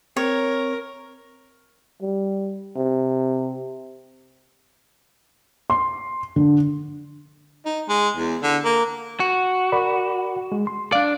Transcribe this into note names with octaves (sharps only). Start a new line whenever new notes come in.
C4 A#4 C#5
G3
C3
C6
D3
D#4
G#3
E2
D3
A#3
F#4
A#4 D5 B5
G#3
C6
D4 D5 F5